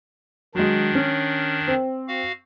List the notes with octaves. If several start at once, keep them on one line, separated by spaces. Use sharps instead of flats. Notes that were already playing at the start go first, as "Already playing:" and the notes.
D#3 F#3 G#3 D4
C#4
C4
F#4 F5